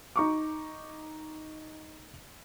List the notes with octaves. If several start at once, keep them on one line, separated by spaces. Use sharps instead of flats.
D#4 C#6 D6